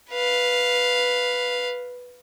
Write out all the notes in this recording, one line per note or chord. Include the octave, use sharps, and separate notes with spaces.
B4 F5